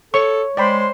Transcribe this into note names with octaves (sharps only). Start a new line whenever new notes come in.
A4 C#5 C#6
G#3 C5 D5 G5 B5